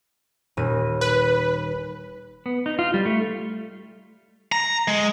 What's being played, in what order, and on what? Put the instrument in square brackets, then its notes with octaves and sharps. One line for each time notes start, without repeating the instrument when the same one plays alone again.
[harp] D#1 D#7
[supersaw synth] B4
[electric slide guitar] B3
D#4
F4
G3
A3
[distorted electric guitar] A#5
G#3